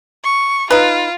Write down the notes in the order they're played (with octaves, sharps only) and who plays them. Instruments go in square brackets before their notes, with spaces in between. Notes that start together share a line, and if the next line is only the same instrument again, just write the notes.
[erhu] C#6
[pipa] D#4 B4 [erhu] F4